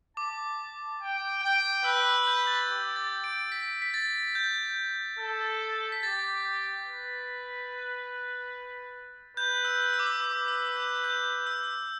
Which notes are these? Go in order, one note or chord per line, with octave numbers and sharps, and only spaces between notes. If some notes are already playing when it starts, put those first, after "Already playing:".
A5 D6
G5
G5
B4 E6
E6
G6
A6
G4
A6
D7
B6
B6
A6
G6
A4
B6
G4 A6
B4
B4 G6
E6
E6
D6
E6
B4 D6
E6
G6
G6
E6